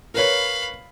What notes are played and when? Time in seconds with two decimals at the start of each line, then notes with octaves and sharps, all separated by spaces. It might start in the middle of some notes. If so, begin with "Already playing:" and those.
0.14 A#4 B4 C#5 F5 B5